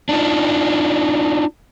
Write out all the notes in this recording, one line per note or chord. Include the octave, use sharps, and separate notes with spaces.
D4 D#4 F4